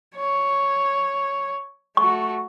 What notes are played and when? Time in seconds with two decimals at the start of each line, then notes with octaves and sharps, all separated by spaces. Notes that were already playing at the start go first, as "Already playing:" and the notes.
0.16 C#5
1.97 A3 F#4 C#6